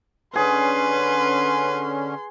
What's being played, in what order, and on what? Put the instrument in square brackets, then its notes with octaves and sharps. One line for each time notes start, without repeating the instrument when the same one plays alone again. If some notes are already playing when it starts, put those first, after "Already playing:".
[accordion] D3 C#4 [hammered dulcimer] G#4 [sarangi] B4 [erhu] C6